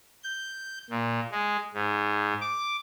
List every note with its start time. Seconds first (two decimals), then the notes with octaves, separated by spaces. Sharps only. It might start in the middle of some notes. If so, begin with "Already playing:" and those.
0.23 G6
0.90 A#2
1.31 G#3
1.73 G#2
2.41 D6